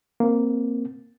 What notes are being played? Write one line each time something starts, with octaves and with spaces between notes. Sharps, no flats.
A#3 C4